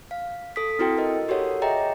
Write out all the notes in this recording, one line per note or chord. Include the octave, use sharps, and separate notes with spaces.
F5
A4 D#6 B6
C4 E4 F#4 A4 G5
A#4 D#5
F#4 G4 A4 A#4 C#5 F#5
G#4 C#5 D#5 E5 G5 A#5